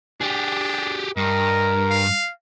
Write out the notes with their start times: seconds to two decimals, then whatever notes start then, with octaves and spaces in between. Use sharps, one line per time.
0.21 D4 G4 G#4
1.17 G2 A#4 D#5
1.90 F5